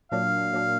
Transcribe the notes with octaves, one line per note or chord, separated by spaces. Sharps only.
A#2 F#3 A#3 D4 F5
A#2 F#3 A#3 D4